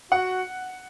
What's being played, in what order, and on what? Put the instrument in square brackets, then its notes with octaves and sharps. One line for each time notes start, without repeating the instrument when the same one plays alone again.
[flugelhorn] F#4 [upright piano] F#5